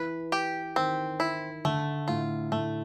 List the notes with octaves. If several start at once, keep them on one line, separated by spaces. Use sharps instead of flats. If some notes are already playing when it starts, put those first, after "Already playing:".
Already playing: E3 B4
G4
D#3 C4
E4
D3 A3
A2 F4
A2 A3